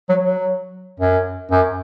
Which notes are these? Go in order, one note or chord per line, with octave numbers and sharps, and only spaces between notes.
F#3
F#3
F#2
F#2